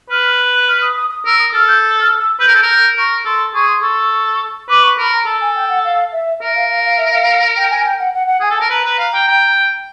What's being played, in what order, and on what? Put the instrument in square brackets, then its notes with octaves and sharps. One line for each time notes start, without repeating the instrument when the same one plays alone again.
[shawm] B4 [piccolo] F6
[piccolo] F#6
F6
D#6
D#6
D#6
[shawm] A#4 [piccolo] E6
[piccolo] D#6
[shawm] A4 [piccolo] F6
[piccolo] G6
F6
E6
[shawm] B4 [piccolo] G6
[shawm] A#4
A4
A#4
[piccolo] G6
[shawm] A#4 [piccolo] C#6
[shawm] A4 [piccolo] C6
[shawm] G#4 [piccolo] C#6
[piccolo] C6
[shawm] A4 [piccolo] C#6
[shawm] B4 [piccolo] D6
[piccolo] C#6
[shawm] A#4 [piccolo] B5
[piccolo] A#5
[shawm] A4 [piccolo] A5
[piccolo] G#5
G5
F#5
F5
E5
[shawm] A#4 [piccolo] E5
[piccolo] F5
F5
F5
E5
F5
G5
G#5
G5
F#5
F#5
F#5
[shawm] G#4 [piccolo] G#5
[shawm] A4
[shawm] A#4 [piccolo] A5
[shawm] B4 [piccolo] A#5
[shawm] B4
F5
G5
G5